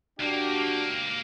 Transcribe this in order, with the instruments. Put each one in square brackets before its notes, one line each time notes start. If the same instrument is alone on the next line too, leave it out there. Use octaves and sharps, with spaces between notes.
[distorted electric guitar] C#2 A#3 [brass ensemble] D4 F#4 G4